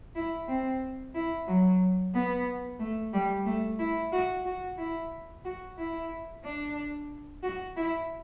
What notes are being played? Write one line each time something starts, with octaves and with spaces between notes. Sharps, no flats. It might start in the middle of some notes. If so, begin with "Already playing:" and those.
E4
C4
E4
F#3
B3
A3
G3
A3
E4
F#4
F#4
E4
F#4
E4
D4
F#4
E4